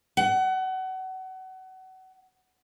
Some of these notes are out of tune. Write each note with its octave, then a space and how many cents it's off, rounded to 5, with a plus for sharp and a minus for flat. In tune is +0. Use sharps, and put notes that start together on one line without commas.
F#5 +30